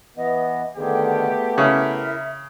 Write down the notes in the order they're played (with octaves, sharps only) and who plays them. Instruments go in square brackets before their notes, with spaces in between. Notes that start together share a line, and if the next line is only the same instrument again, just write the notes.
[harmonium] E3 B3 [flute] D#5
[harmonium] D3 D#3 [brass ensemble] A3 B3 G4 [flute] G#4
[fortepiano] C#3 [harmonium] E4 A#4 [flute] E5